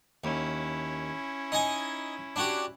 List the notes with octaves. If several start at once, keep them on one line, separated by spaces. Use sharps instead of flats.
D#2 C#4 E4
D#4 D#5 G#5
D4 F#4 G4